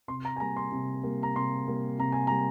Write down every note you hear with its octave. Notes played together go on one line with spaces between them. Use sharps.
C3 C6
A#5
G#5
G3 A#3 A#5
C6
C3
G3 A#3
A#5
C3 C6
G3 A#3
C3 A#5
G#5
G3 A#3 A#5